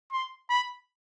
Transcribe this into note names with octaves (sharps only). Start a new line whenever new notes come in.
C6
B5